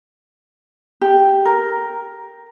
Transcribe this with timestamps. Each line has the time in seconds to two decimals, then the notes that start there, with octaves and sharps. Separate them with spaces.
1.01 G4
1.45 A#4